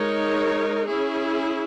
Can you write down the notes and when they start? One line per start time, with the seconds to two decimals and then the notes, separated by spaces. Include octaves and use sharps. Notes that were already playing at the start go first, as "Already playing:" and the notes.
Already playing: G#3 D#4 A#4 C#5
0.87 C#4 E4 G#4